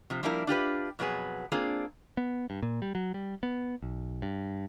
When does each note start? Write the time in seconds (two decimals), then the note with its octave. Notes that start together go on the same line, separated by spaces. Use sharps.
0.10 C3 F3
0.23 F3 G3 A#3 D4 E4 A#4
0.47 D4 F4 G4 B4
0.99 F2 B2 F#3 B3 G#4
1.52 A#3 C4 D4 F4 G#4
2.17 B3
2.50 G2
2.62 A#2
2.82 G3
2.95 F#3
3.14 G3
3.43 B3
3.82 B1
4.22 G2